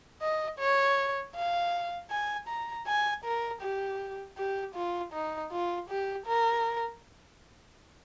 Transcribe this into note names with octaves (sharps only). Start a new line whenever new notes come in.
D#5
C#5
F5
G#5
A#5
G#5
A#4
G4
G4
F4
D#4
F4
G4
A#4